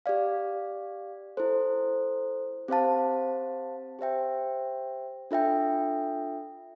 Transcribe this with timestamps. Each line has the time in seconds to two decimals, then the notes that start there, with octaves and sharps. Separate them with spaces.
0.06 G4 D5 F5
1.37 E4 A4 C5
2.68 C4 G4 C5 F5 A5
3.99 G4 C5 E5 G5
5.31 D4 F4 A4 E5 G5